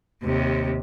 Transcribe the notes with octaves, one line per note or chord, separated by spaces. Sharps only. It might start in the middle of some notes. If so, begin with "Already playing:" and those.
D#2 C3